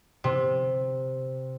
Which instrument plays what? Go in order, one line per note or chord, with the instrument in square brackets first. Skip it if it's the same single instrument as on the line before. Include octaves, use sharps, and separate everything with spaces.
[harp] C3